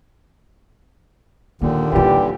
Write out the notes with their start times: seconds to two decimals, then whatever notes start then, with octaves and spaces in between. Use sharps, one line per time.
1.61 D#2 A#2 D3 D#3 A#3
1.92 E3 G3 C#4 F4 G4